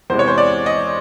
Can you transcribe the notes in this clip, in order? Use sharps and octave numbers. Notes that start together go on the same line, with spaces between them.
E2 C3 E3 G#3 C5
C#5
C5
D5
D#5